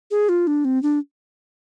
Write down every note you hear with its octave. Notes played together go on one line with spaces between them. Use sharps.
G#4
F4
D4
C4
D4